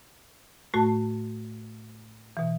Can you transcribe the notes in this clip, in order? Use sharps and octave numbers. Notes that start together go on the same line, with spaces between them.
A2 A3 F#4 A5
B2 E3